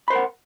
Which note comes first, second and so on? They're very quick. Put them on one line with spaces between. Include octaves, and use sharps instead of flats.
B5 C5 A#4 F#5